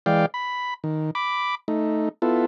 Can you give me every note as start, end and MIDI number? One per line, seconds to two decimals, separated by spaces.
0.06 0.26 52
0.06 0.26 56
0.06 0.26 74
0.06 0.26 77
0.06 0.26 79
0.34 0.74 83
0.84 1.11 51
1.15 1.55 83
1.15 1.55 86
1.68 2.09 57
1.68 2.09 63
2.22 2.46 59
2.22 2.46 64
2.22 2.46 65
2.22 2.46 69